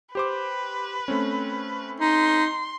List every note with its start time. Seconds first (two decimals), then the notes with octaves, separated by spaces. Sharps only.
0.15 G4 B4 C5 D6
1.08 A3 C4 C#4
2.00 D#4 C6